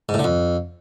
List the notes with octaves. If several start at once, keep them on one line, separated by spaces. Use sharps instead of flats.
G#2
A2
D3
F2